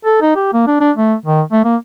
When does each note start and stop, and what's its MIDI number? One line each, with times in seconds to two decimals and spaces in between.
0.05 0.19 69
0.22 0.35 63
0.36 0.52 67
0.53 0.65 58
0.67 0.80 62
0.81 0.92 62
0.97 1.15 57
1.26 1.42 51
1.52 1.63 57
1.65 1.76 58